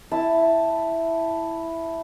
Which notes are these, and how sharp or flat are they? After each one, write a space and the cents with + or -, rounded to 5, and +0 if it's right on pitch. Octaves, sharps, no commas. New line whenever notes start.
E4 +0 A5 +0